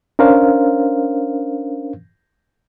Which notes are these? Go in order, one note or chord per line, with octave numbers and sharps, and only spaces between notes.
C#4 D4 A#4 C5 F5